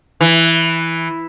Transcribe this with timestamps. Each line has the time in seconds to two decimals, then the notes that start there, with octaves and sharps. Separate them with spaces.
0.21 E3